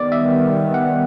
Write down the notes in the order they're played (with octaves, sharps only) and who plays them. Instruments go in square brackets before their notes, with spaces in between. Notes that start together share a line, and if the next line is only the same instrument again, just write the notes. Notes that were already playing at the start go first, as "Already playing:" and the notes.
Already playing: [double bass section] D#3 G3 B3 [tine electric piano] D5
[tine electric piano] E5
F#5